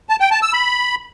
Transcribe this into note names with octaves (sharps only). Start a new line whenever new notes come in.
A5
G5
A5
E6
B5